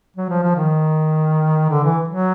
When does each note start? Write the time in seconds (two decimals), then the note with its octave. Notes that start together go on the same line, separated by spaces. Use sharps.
0.17 F#3
0.29 F3
0.43 F3
0.56 D#3
1.70 D3
1.84 E3
2.09 F#3